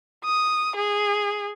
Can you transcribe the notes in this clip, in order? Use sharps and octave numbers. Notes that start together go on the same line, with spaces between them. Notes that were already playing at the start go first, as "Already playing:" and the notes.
D#6
G#4